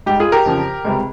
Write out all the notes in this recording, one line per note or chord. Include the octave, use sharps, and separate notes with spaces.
G#2 G3 G4
F4 G#4
G4 A#4
F2 C#3 F3
C#2 C3 G3